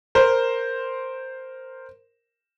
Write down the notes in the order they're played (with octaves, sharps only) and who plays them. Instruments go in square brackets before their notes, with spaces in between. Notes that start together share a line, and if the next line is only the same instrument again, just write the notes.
[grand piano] A#4 C5